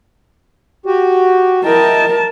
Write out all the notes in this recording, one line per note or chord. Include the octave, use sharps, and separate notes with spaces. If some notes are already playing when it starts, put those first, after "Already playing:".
F#4 G4
E4 A#4 D#5 G5 A5